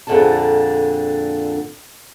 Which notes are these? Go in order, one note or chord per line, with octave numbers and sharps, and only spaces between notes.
F2 A#2 D3 G#4 A4 A5